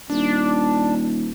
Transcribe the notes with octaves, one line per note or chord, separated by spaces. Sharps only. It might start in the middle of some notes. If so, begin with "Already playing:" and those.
D#1 D4